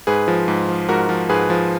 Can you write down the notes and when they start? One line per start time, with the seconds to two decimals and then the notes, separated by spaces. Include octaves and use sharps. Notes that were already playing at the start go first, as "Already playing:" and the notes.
0.07 G#2 G#4 B4
0.28 F3
0.48 G#2
0.68 F3
0.89 G#2 F#4 A#4
1.09 F3
1.29 G#2 G#4 B4
1.50 F3